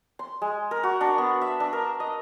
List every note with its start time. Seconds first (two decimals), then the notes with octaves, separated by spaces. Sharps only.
0.19 C6
0.42 G#3
0.71 A#4
0.83 F#4
1.01 D4
1.18 B3
1.41 E5
1.60 D4
1.73 A#4
2.00 D#5